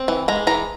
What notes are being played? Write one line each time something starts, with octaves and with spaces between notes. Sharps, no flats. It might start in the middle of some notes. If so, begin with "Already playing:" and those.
Already playing: C4
E3
G#3 A#5
E3 A#5